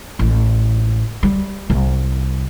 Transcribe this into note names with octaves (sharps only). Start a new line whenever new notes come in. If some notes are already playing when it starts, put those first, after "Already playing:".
A1
G3
C2